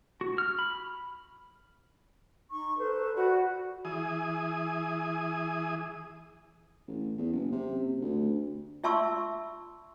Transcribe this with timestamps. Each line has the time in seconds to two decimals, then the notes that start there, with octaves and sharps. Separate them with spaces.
0.21 F#4
0.38 F6
0.59 B5
2.51 D#4 C#6
2.78 A4 B4 C5
3.17 F#4 D5 F#5 B5
3.85 E3 G#4 D#6
6.87 A1
7.17 E2
7.33 F#1
7.52 C3
7.84 F#1
8.01 D2
8.84 F4 E5 A5 C6 C#6 E6